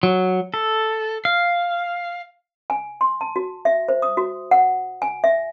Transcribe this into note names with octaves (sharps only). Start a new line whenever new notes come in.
F#3
A4
F5
G#5
C6
A5
F#4
E5
C5
D#6
F#4
F#5
G#5
E5